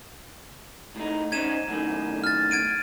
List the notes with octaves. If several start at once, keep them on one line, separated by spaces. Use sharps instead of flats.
A2 D#4
C#4 D#4 C5 G#6 D#7 E7
F#2 A2 D#3
F6 A6
G#6 D7 D#7